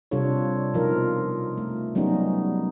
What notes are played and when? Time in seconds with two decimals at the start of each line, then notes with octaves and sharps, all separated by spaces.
0.11 C3 G3 D4 F4 A4 C#5
0.74 B2 F3 D#4 F4 A#4
1.57 A3
1.95 F#3 G3 B3 C#4 D#4